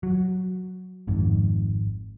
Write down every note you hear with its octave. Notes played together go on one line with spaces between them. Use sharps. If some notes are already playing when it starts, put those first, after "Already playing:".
F#3
G#1 F2 G#2